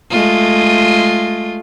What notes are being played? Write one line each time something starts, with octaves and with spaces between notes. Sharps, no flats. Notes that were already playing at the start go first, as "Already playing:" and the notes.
G#3 A3 F4